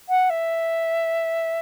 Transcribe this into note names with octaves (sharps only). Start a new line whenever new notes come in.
F#5
E5